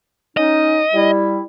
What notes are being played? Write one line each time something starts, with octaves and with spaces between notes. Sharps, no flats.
C#4 D#4 D#5
G3 E4